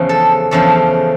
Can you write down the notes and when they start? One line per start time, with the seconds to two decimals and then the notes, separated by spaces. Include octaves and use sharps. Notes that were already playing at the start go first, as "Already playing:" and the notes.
Already playing: E2 C#3 F3
0.09 A4
0.51 E2 C#3 F3 A4